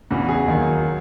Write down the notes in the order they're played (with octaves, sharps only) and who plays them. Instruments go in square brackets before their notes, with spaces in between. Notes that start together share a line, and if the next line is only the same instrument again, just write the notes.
[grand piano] E2 C#3 E3 F#4
G#4
D#2 D#3 F#3
F#3